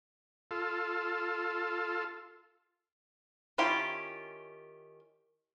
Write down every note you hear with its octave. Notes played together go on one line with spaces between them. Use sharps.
F4 A4
D#3 C#4 E4 F4 G4